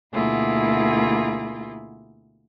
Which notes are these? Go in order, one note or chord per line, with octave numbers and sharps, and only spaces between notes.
D2 B2 A#3 E4 F4 G#4